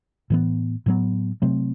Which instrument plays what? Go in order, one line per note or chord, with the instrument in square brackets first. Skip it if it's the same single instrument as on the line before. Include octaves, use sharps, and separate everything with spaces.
[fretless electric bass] A2 E3 B3
A2 F#3 B3
C3 F#3 A3 C4